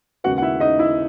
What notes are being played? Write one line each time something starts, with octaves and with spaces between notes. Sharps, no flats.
D#2 C#3 G#3 B3 F#4 F#5
F#5
E4 E5
D#4 D#5
E4 E5